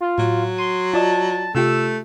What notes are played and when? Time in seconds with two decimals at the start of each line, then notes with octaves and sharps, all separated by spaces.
0.01 F4
0.18 A2 F#3
0.58 C6 D#7
0.94 F4 D5 D#5 A5
1.55 C3 A3 F4 G4 E6